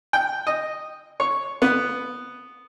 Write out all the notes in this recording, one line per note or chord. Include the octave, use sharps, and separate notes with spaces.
G5
D#5
C#5
B3